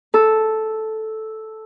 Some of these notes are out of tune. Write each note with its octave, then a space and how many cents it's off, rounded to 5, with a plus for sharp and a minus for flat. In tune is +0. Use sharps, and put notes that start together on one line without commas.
A4 -5